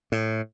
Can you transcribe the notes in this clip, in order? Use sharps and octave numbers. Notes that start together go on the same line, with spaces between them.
A2